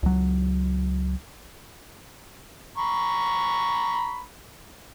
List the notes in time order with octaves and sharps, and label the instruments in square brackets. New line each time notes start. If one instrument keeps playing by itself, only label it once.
[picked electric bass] C#2 F#3
[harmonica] A#5 B5 C#6